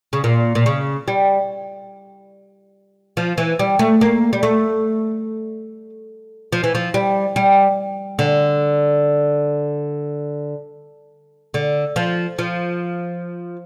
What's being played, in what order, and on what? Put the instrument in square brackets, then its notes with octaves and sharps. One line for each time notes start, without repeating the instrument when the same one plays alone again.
[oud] C#3
A#2
A#2
C#3
G3
F3
E3
G3
A3
A#3
G3
A3
F3
E3
F3
G3
G3
D3
D3
F3
F3